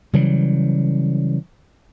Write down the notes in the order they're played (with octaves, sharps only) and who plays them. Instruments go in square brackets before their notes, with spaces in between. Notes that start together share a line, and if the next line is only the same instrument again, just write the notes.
[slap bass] C#3 E3 F#3 G3